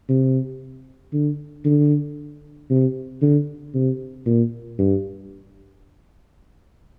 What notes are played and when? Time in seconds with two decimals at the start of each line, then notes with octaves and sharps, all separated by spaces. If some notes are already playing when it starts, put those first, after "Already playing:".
0.09 C3
1.13 D3
1.65 D3
2.70 C3
3.22 D3
3.74 C3
4.26 A#2
4.78 G2